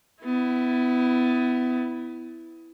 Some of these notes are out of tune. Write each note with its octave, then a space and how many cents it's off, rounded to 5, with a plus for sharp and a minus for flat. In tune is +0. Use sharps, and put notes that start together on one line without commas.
B3 +30 E4 +0